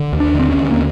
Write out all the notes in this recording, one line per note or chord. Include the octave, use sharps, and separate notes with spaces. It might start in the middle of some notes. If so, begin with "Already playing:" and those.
Already playing: D3
D#2
D4
D3 C4
C#4
D#2
A#3